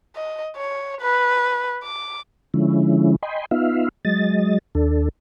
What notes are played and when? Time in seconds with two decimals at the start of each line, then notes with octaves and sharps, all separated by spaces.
0.16 D#5
0.57 C#5
1.01 B4
1.83 D6
2.54 D3 F3 G#3 C#4 E4
3.23 D#5 G5 G#5 B5 C6
3.51 B3 D#4 F4 E5 F5
4.05 F#3 G#3 D#5 A6
4.75 D#2 D4 A4